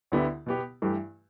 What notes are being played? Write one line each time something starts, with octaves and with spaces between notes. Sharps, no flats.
D2 D3 B3 E4 G4
B2 B3 G4
G2 E3 A3 E4 G4